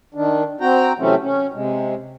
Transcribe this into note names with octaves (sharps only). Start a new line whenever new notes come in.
D#3 D4
C4 F#4 G5 A#5
C3 E3 F#3 A3 C4 C#4
C#4
C3 G#3